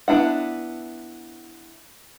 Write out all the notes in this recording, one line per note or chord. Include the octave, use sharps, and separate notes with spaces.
B3 D4 E4 F#5